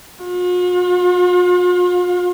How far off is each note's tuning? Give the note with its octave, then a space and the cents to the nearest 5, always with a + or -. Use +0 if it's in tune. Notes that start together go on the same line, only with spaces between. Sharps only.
F4 +45